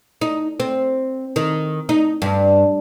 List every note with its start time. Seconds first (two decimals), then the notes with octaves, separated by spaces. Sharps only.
0.21 D#4
0.60 C4
1.36 D#3
1.89 D#4
2.22 G2